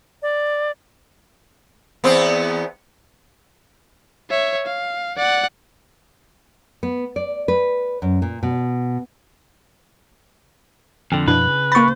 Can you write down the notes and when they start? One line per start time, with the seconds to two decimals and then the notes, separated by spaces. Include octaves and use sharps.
0.22 D5
2.04 E2 B3 C4
4.30 C#5 E5
4.66 F5
5.17 D5 F#5
6.83 B3
7.16 D5
7.48 B4
8.02 F#2
8.22 A#2
8.43 B2
11.12 F2 D3 G5
11.28 F#2 B2 F3 D4 E4 B4
11.49 C#3
11.72 A#3 B5 C#6 A6